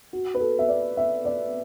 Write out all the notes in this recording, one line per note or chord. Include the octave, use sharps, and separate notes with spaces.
F#4
B4
A4
E5
D5
E5
D5